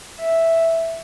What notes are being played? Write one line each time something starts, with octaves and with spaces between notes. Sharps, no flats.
E5